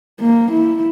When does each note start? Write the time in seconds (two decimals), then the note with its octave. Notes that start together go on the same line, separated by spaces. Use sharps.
0.21 A#3
0.51 E4